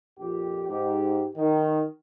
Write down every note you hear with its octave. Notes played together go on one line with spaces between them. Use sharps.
A#1 F2 G4
G#2 G4
D#3